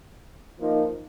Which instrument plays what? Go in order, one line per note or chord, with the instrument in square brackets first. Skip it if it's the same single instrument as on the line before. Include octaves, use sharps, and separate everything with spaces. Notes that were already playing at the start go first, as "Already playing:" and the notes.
[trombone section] F3 A#3 D#4 A#4